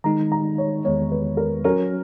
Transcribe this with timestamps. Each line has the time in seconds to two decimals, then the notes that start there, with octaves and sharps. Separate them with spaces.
0.04 D#3 G#3 D#4 A#5
0.32 A#5
0.58 C#5
0.84 E2 D#3 G#3 B3 C#5
1.12 B4
1.37 A#4
1.64 F#3 C#4 F#4 A#4 C#5